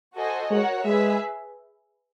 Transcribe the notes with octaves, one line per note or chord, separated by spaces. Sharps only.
F#4 A4 C5 D#5 G#5
G#3 F#4 A#4 C#5 F#5
G#3 G#4 B4 E5